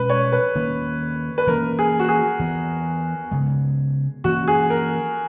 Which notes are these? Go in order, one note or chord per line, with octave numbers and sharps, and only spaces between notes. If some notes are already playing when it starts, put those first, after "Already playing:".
Already playing: B2 G#3 C#4 B4
C#5
B4
D#3 A#3 C#4
B4
E3 A#3 C#4 A#4
G#4
F#4
G#4
E3 B3
C#3 G#3 B3
E3 A#3 C#4 F#4
G#4
A#4